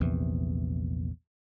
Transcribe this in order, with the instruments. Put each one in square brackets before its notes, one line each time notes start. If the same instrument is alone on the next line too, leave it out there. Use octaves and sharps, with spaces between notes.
[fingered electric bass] A#1 E2 C3